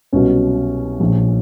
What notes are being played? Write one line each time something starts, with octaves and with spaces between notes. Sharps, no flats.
C2 B2 F#3 C#4
A#1 A#2 F3